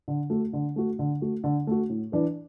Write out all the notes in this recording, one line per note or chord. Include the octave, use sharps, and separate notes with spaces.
D3
A3 F#4
D3
A3 F#4
D3
A3 F#4
D3
A3 F#4
A2
E3 D4 B4